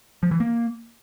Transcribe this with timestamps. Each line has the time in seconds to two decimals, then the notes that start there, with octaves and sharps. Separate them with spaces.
0.23 F3
0.31 E3
0.40 A#3